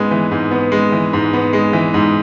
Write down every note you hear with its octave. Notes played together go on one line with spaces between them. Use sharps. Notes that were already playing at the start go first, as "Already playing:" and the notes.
Already playing: G#2 G#3 B3
E3
G#2
B3
G#3
E3
G#2
B3
G#3
E3
G#2